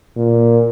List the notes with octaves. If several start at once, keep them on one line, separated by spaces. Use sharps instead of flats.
A#2